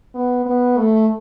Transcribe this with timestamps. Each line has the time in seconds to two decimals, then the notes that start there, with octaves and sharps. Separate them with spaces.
0.14 B3
0.45 B3
0.77 A3